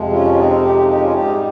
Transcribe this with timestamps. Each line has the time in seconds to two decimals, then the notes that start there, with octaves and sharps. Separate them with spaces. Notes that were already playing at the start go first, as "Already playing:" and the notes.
Already playing: F2 C3 F3 G#3
0.13 C#4 F4
0.38 C4 D#4
0.63 D#4 G4
0.75 D#4 G4
0.88 D#4 G4
1.01 C#4 F4
1.14 G#2 G3 D#4 G4